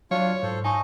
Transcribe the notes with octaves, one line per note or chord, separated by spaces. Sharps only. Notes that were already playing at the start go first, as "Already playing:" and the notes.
F#3 D4 F4 C#5 F5
G#2 A4 C5
D#4 D#5 G#5 A5 C#6